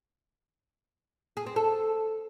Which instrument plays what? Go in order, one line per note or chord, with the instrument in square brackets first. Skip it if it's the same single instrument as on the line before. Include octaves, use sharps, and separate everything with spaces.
[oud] G#4
C4
A4